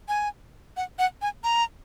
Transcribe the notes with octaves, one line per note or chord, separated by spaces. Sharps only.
G#5
F#5
F#5
G#5
A#5